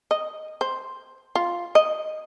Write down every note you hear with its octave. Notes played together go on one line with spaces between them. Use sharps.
D#5
C5
F4
D#5